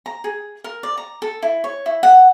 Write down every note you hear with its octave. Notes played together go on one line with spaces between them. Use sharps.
A#5
G#4
A#4
D5
A#5
A4
E4
C#5
E4
F#5